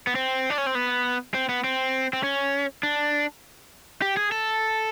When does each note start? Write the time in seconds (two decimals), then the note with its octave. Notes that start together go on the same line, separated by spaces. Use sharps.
0.07 B3
0.15 C4
0.50 D4
0.58 C#4
0.66 C4
0.75 B3
1.34 C4
1.49 B3
1.64 C4
2.13 C4
2.23 C#4
2.83 D4
4.02 G4
4.17 G#4
4.32 A4